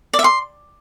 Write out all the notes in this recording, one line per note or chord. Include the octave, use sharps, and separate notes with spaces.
D5
E5
C6